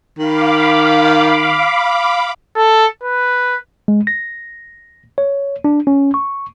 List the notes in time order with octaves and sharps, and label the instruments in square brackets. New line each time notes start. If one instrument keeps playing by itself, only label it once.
[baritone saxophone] D#3 [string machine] F5 B5 D6
[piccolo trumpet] A4
B4
[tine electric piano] G#3
A#6
C#5
D4
C#4
C#6